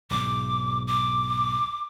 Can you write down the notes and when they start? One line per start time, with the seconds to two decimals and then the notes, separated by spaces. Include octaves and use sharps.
0.11 B1 G#2 D6
0.87 D6